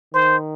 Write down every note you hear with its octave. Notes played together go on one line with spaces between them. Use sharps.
D#3 C5